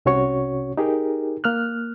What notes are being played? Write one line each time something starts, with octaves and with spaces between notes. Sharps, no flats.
C2 C3 C#4 F#4 C#5 C#6
D#4 G4 G#4 A#4
A#3 F6 F#6